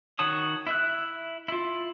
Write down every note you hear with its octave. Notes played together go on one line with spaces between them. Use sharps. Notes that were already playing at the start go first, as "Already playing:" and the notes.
D#3 F#4 C#5 A5 D#6
E4 E5 F#6
E4 F4